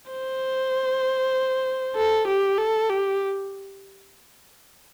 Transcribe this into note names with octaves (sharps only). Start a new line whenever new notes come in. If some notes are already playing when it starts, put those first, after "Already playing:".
C5
A4
G4
A4
G4